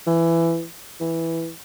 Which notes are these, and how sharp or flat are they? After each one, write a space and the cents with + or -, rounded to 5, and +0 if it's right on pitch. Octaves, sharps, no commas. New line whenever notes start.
E3 +15
E3 +0